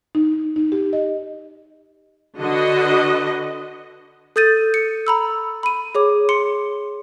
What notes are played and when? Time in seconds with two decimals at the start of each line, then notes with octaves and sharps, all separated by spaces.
0.15 D#4
0.56 D#4
0.72 G4
0.93 D#5
2.38 D3 F#4 B4 D#5
4.36 A4 D#6 G6 A6 D#7
4.74 C#7
5.07 A#5 B5 E6
5.63 B5 D#7
5.95 G#4 C#5 D6
6.29 C6 C#7